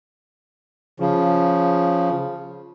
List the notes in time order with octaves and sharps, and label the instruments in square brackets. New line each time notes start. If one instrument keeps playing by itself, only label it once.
[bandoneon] C#3 F3